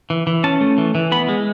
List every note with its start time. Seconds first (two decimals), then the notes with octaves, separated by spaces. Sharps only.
0.10 E3
0.27 E3
0.44 C#4 A5
0.61 A3
0.78 E3
0.95 E3
1.12 B3 B5
1.29 G#3